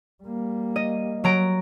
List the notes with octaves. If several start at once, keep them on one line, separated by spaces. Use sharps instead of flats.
G3 A#3
D#5
F#3 A#5 D7